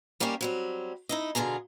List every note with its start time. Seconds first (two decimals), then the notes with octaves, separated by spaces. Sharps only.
0.20 G3 A#3 C#4 D#4 G4
0.41 F#3 G3 C4
1.09 D#4 E4 D#5
1.35 B2 D3 F4 G#4 A#5